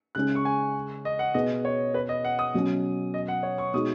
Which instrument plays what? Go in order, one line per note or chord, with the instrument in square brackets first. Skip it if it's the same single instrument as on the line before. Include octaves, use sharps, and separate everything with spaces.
[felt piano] C#3 G#3 C#4 [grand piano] F#6
[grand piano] C#6
G#5
D#5
F#5
[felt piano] B2 B3 G#4 [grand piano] D#5
[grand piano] C#5
B4
D#5
F#5
D#6
[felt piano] B2 F#3 C#4
[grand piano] D#5
F#5
C#5
C#6
[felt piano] B2 G#3 D#4 F#4 [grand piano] D#6